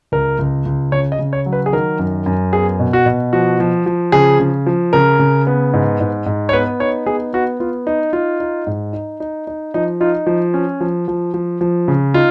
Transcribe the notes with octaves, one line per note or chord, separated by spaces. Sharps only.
C#2 A#4
C#2
C#2
C#3 C#5
D#5
C#3
C#5
F#3
B4
G#4
D#3 A#4
F#2
F#2
B3 G#4
B2
F#4
B2
F3 F#4
F3
F3
C#3 G#4
C#3
F3
C#3 A#4
C#3
B3
G#2
G#2
G#2
C#5
B3 B4
D#4 C#5
B3 G#4
B3 F#4
B3 F4
D#4
D#4 F4
D#4
G#2
D#4
D#4
D#4
F3 D#4
D#4 F4
F3
C#4
F3
F3
F3
F3
C#3
D#4 F4